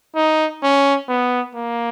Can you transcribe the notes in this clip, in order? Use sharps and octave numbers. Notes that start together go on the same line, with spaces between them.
D#4
C#4
B3
A#3